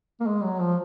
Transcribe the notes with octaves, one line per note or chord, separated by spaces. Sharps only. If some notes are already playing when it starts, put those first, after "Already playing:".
A#3
G#3
F#3
F3